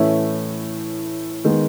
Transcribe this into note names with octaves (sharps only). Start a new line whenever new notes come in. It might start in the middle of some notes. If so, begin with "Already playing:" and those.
Already playing: A2 E3 A3 C#4 E4
D#3 G#3 B3